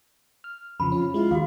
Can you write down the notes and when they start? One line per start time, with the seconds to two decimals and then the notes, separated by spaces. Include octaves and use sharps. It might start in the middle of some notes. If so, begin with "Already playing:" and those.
0.44 F6
0.80 F2 C#3 F3 B5
0.92 C#4 F4
1.14 G#3 E4 F4
1.31 D#2 F#4 F5